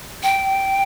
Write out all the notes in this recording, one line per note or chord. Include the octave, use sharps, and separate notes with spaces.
G5